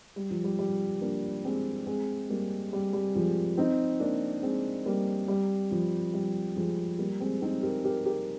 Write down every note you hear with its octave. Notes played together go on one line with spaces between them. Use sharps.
G3
F3
G3
G3
A#3 D4
G#3 C4
G#3 C4
G3 A#3
G3
G3
F3 G#3
C4 D#4
A#3 D4
G#3 C4
G3 A#3
G3
F3
G3
F3 G#3
G3 A#3
G#3 C4
C4 D#4
G4 A#4
G#4
G4 A#4
G4 A#4